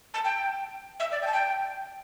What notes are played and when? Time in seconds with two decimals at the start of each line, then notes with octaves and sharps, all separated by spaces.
0.14 A5
0.24 G5
0.99 E5
1.11 D5
1.22 G5
1.26 A5
1.33 G5